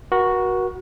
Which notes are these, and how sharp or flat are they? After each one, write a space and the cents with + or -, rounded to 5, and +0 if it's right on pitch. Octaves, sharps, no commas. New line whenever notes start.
F#4 +0 A#4 +40 F#5 +0